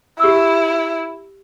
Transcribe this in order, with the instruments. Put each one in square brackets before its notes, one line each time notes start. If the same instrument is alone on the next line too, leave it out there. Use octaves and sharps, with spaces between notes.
[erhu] E4 [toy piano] G4 E6